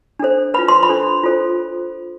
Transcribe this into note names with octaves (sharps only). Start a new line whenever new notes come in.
D4 A4 C5
F4 B4 B5
C6
B5
D4 A4 C5
F4 A4 C5